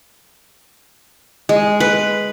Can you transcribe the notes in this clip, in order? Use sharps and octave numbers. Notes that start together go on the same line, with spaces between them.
G#3
B4